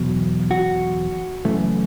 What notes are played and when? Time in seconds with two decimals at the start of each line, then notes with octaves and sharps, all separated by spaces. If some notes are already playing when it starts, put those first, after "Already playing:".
Already playing: E2 B2 F#3
0.51 F#4
1.45 F#2 C#3 E3 A3